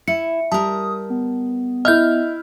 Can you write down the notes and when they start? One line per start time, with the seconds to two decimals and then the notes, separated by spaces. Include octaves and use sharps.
0.08 E4 C#7
0.52 G3 A#4 A5 D#6
1.10 B3
1.85 E4 D#5 E5 F6 G6